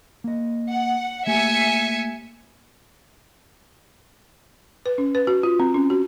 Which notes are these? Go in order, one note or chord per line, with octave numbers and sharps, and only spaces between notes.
A#3 D#5
F#5
A3 A#3 G4 E5 G#5 C#7
B4
C#4
B4
F#4
F4
C4
C#4
F#4